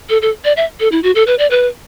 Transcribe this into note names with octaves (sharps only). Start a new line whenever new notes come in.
A4
A4
D5
E5
A4
E4
F#4
A4
B4
D5
B4